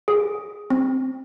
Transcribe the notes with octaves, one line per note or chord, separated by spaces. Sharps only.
G#4
C4